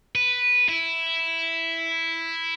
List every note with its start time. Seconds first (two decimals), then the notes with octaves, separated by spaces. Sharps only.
0.15 B4
0.69 E4